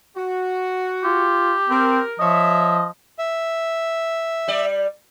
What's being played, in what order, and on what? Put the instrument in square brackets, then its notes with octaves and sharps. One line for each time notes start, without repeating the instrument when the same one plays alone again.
[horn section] F#4
[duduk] F4 [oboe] G4
[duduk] C4 [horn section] A#4
[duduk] F3 [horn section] C#5 E5 [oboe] D#5
[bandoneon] E5
[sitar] G3 D5